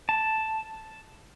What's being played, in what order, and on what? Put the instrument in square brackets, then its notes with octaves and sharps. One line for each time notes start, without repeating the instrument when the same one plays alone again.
[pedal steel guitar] A5